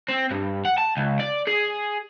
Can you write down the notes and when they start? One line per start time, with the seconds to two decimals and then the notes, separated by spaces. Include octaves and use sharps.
0.09 C4
0.31 G2
0.65 F#5
0.78 A5
0.97 C#2
1.20 D5
1.47 G#4